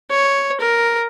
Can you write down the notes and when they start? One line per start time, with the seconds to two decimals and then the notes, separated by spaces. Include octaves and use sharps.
0.11 C#5
0.60 A#4